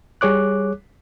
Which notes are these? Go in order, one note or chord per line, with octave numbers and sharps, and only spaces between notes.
G3 G#4 C#5 D6 F#6